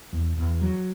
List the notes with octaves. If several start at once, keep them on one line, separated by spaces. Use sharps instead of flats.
E2
E2
F#3